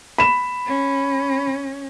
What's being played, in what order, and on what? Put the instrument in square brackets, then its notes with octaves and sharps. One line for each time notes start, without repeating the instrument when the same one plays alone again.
[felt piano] B5 E7
[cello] C#4